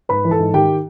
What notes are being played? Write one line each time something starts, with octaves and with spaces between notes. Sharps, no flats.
G#2 B4 B5
E3
A4 A5
G#2
D#3 G4 G5